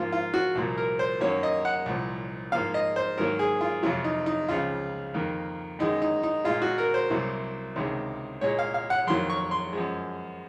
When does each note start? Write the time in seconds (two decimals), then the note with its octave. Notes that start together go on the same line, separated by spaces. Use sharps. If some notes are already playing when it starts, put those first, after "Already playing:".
Already playing: G#2 F3 A#3 F4
0.12 F4
0.34 F#4
0.55 C2 A#2 F3 A#3
0.78 A#4
0.99 C5
1.21 F#2 D#3 F#3 A#3 C#5
1.43 D#5
1.65 F#5
1.86 C2 A#2 F3
2.52 G#2 F3 A#3 F5
2.74 D#5
2.96 C5
3.18 G#2 D#3 F#3 A#3 A#4
3.39 G#4
3.61 F4
3.83 F2 C3 F#3 F4
4.04 D#4
4.26 D#4
4.49 C#2 C#3 F3 F4
5.14 F2 D#3 A#3
5.79 F#2 D#3 G#3 D#4
6.02 D#4
6.23 D#4
6.45 A#2 G#3 F4
6.62 F#4
6.78 A#4
6.94 C5
7.10 C2 C3 F#3 A#3
7.76 C#2 C3 D#3 G#3
8.41 A#2 G#3 C#5
8.59 F5
8.74 F5
8.90 F#5
9.07 F2 D#3 F#3 A#3 C6
9.30 C#6
9.51 C6
9.73 F#2 F3 G#3